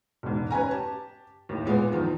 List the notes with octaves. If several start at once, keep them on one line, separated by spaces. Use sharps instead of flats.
E1 G#2
C#4 B4 G#5 A#5
G4 A5
D#2 A2
A#2 G#3 B3
E2 D#3 F3